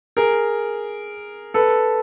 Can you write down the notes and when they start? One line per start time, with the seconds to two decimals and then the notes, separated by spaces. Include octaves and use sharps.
0.17 G#4 A#4
1.54 A4 B4